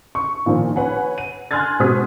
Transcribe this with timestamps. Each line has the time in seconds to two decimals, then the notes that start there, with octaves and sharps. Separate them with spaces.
0.15 C#6
0.46 A#2 D#3 F3
0.76 B4 C#5 F#5 G#5
1.18 D#7
1.51 G#5 C6 F6 F#6 G#6 A6
1.80 B2 G#3 C5 D#6 B6